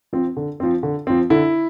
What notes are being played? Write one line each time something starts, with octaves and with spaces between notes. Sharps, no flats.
F3 C4
D3
F3 C4
D3
F3 C4
D3 E4